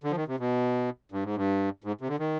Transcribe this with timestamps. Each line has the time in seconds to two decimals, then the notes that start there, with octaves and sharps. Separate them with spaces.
0.04 D3
0.11 F3
0.16 D#3
0.28 C3
0.39 B2
1.12 G2
1.24 G#2
1.36 G2
1.84 G#2
2.01 C3
2.08 D3
2.19 D#3